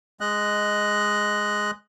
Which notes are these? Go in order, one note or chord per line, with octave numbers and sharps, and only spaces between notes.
G#3 D#5 F#6